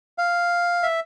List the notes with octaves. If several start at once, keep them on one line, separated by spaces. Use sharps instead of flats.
F5
E5